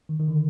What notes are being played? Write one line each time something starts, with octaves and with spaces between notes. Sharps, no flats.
D#3
D#3
D3